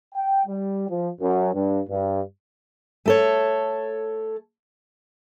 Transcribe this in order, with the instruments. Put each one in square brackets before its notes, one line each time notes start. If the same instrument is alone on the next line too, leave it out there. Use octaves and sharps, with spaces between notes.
[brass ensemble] G5
G3
F3
F#2
G2
G2
[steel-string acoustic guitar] A3 A4 C#5